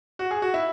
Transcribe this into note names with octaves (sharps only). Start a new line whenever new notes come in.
F#4
G#4
F#4
E4